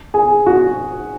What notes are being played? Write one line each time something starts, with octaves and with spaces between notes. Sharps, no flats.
G#4
F#4